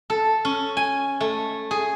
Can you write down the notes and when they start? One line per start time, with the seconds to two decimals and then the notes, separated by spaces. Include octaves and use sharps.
0.10 A4
0.45 C#4
0.77 G#5
1.21 A3
1.71 G#4